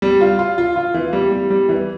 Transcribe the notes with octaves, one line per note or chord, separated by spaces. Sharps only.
G3
F4
F4
F4
F4
E3
G3
G3
G3
E3